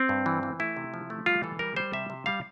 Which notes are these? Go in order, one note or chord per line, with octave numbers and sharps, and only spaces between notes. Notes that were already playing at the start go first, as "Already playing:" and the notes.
Already playing: C4
G2
E3
E3
A3 E4
C3
F3
A3
G3 F4
E3 A4
G3 A#4
G3 C5
C3 E5
C3
G3 F5